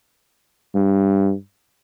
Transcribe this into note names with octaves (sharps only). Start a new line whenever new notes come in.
G2